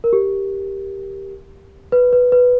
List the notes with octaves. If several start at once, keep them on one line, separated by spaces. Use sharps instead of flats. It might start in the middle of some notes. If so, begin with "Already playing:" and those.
A#4
G4
B4
B4
B4